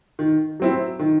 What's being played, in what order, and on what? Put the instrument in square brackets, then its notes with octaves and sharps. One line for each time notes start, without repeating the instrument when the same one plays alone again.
[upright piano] D#3
F#3 C4 E4
D#3